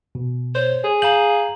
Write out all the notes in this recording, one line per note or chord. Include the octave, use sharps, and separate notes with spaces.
B2
C5 C#5
G#4
F5 A#5 G6 F#7